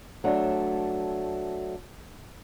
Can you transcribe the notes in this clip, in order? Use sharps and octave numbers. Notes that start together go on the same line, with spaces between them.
F#3 A3 D4